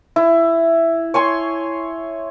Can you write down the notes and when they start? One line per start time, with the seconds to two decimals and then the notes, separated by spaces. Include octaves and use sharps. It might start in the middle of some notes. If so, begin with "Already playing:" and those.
0.16 E4
1.14 C#5 G#5 C6 C#6